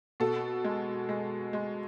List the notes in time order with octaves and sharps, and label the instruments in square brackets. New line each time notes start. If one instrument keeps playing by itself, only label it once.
[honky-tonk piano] B2 A4
G#3
G#3
G#3